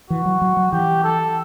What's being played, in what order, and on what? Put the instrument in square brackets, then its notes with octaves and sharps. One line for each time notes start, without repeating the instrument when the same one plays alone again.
[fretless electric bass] E3 [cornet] F#4
[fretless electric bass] F#3
F#3
F#3
[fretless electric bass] E3 [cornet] G4
[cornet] A4